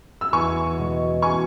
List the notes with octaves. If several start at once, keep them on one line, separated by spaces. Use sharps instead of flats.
E6
E2 G#5 C#6
B2 G#3
G#5 C#6